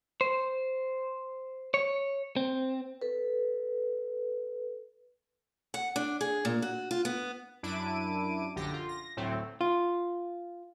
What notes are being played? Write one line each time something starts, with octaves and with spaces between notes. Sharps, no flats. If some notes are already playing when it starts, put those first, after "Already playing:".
C5
C#5
C4
A4 B4
F#5
D4
G#4
A#2
F#4
F4
B3
F#2 D4 E4 D6 D7 D#7
A#1 F#2 D3 G4 A#6
F4
A#6
D2 A2 F#3 A3 C4
F4